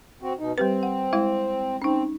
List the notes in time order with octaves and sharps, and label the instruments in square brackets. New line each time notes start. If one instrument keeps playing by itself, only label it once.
[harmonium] C4 F#4
B2 D#4
[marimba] G3 G4 B4 [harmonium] C4
[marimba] F#5
G#3 E4 E5
[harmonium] C4 [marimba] C#4 D#4